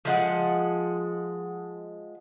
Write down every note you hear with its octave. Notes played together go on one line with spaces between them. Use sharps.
F3 G#3 F#5